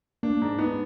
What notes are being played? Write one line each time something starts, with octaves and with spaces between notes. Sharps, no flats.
A#3 D4
G#2
B3 D#4